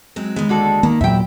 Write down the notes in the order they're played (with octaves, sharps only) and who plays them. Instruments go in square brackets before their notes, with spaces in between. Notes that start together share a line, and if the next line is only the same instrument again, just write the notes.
[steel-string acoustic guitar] F#3 G#3 C4
[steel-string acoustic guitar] D#2 G#3 [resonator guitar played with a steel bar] B3
[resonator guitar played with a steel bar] D3 F#4 A4
[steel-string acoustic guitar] D#3 [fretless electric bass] A#3
[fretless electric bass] E2 A#2 F#3 [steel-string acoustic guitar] E4 [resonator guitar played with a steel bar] E5 G5